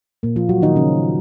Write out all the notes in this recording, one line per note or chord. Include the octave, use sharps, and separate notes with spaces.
A#2 A#3
F3 F4
F#3 F#4
D#3 D#4
C#3 C#4